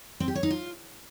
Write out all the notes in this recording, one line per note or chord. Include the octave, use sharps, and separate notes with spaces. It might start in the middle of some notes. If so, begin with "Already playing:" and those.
C4
G4
C#5
D#4
F4